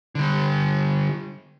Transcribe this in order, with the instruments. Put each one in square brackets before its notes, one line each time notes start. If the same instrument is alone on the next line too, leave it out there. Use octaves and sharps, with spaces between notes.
[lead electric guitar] D3 G3